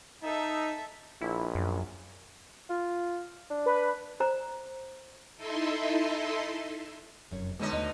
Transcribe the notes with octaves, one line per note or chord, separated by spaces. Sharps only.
D#4 A4 E5
A#1 E4
F#2
F4
D4
B4
C5 A#5
D#4 E4 A4 D#5 E5 C6
F1 F#2 C#5
B2 D3 G#3 B3 D#4 C#5
D#2 A3 D#5